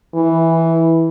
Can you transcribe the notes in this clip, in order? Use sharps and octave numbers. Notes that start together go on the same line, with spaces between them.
E3